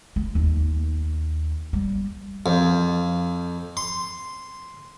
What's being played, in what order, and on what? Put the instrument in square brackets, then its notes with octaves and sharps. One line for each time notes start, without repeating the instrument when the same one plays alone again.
[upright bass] A3
D#2
G3
[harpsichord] F2
C6